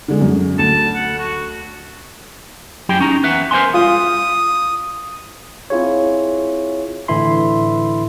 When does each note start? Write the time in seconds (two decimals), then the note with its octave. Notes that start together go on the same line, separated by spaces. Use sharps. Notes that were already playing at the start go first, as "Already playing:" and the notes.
0.08 D3 G#3
0.21 F#2
0.59 D2 A5
0.96 F#5
1.19 F#4
2.89 F#2 F#3 E4 G4 G#4 G5
3.00 C#4 D#4 A#5
3.23 E2 B4 E5 F#5
3.51 A#4 C5 D#5 E5 G#5 C6
3.74 F4 D#6
5.70 C4 E4 F4 G#4 C#5
7.08 A2 D3 E3 E4 B5 C6